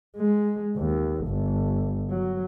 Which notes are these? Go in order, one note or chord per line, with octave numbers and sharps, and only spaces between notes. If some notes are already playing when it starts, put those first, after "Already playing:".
G#3
D#2
G1
F#3